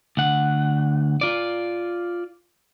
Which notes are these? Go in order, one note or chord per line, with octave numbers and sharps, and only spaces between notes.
D2 F#5
F4 D5